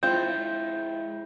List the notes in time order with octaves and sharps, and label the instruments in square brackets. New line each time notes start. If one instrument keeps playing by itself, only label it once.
[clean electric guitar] G#3 E4 [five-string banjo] C4 F4 [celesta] G6